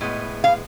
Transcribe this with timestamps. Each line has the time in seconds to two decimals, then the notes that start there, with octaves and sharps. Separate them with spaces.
0.01 A2 G#3 B3
0.44 F5